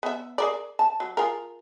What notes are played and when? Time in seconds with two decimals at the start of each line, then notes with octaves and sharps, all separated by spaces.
0.03 B3 E5
0.38 G#4 A#4 D5
0.79 A5
1.00 F#3
1.17 F4 G#4 A#4